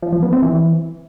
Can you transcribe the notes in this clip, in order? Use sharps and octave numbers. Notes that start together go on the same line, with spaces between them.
F3
F3
B3
C4
E3